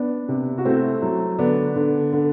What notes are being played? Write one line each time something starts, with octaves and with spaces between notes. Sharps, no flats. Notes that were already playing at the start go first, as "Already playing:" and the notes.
Already playing: B3 D4
C3
F#4
A3 C4 E4
F#3
D3 B3 D4
D3
D3